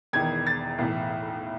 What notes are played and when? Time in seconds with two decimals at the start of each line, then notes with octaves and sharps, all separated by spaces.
0.13 E1 E2 D#3 G#6
0.47 A6
0.79 B1 A2 E3